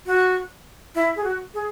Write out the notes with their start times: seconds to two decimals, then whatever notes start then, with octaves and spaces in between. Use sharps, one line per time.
0.06 F#4
0.95 E4
1.16 G#4
1.24 F#4
1.54 G#4